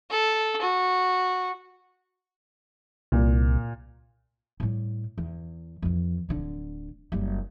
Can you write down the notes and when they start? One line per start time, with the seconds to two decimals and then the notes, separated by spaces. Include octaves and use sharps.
0.11 A4
0.62 F#4
3.12 C2 A#2
4.60 A2 G3
5.18 E2
5.82 F2 E3
6.29 D1 D3
7.12 F#1 G3